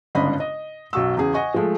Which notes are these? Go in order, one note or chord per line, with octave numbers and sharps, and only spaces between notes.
G1 G#2 C#3 D4 D#5 B5
D#5
B1 F#2 F#4 C#6 E6
E2 C#3 G#4
D#5 F#5 G#5 C#6
F3 G#3 A3